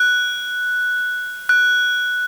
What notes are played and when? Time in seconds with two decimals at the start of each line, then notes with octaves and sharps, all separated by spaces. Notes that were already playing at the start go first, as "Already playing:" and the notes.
Already playing: F#6
1.49 F#6